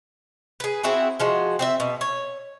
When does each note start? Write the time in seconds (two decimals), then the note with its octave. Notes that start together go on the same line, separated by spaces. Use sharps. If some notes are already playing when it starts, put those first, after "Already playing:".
0.60 G#4 B4
0.83 C4 E4 F#4 G#4
1.20 F3 G#3 F#4
1.59 C4 D#5 E5
1.80 B2
2.01 C#5